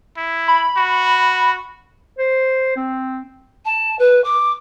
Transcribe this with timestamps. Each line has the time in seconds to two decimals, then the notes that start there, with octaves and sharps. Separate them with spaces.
0.17 E4
0.48 B5
0.77 F#4
2.18 C5
2.76 C4
3.65 A5
3.99 B4
4.24 D6